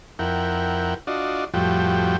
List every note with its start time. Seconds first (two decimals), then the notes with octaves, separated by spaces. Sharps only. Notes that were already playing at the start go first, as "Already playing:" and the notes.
0.19 F2 E4 A#4 F#5 G5
1.07 D4 F4 F#4 D5 D#5
1.54 F2 A2 F3 G3 F#4 G5